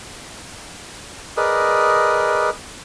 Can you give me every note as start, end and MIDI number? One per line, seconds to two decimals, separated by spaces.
1.37 2.50 68
1.37 2.50 70
1.37 2.50 71
1.37 2.50 74
1.37 2.50 75